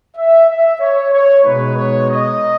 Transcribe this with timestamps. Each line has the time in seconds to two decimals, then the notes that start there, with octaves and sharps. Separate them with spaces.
0.17 E5
0.48 E5
0.80 C#5
1.13 C#5
1.43 B2 G#3 D#4 B4
1.76 C#5
2.08 D#5